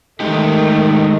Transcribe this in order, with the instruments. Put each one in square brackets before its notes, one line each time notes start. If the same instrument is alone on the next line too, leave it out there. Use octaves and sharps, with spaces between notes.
[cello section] D#3 A3 [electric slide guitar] G#3 D#4 G4